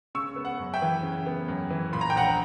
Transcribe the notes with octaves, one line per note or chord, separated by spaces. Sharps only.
C#3 C#6 E6
B3
F#5
F#2
E5 G5
E3
C#3
B3
F#2
E3
A#2 B5
A#5
G5
A#1 F#5 A#5